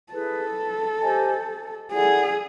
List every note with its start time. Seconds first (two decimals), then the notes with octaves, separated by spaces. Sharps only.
0.13 E4 G#4 A4 B4
1.02 G4 C5 D#5 G#5
1.91 E4 G#4 A4 D5 F#5